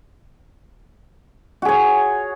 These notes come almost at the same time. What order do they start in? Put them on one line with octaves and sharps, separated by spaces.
F#4 G#4 C#5